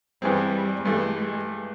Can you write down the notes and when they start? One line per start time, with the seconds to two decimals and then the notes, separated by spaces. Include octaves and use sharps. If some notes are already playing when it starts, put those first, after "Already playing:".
0.22 G2 E3 G3 G#3 C4
0.85 G2 E3 G#3 A3